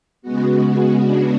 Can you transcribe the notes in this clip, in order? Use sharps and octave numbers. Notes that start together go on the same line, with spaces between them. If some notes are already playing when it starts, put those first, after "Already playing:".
C#3 G#3 B3 F#4
D4